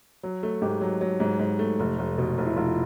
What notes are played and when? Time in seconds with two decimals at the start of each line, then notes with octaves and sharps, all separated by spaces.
0.23 F#3
0.43 A3
0.62 G#2 G4
0.81 F#3
1.01 F#3
1.20 G#2
1.39 G#2
1.59 A3
1.79 F1
1.99 F1
2.18 B2
2.38 F1
2.46 E4
2.56 F1 F4